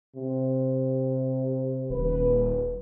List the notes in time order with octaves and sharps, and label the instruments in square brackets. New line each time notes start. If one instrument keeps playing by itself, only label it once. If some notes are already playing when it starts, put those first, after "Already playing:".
[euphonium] C3
[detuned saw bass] D#1 [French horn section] B4